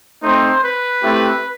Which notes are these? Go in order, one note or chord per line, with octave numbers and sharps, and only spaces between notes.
A3 C4 D#4 C5
B4
A3 C4 E4 G4